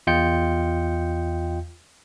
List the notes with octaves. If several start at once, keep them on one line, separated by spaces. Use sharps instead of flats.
E2 F4 D#5 G5 G6 C#7